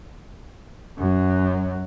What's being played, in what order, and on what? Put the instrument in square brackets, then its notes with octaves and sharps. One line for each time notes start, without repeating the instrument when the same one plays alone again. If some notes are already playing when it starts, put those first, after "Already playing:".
[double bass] F#2 F#3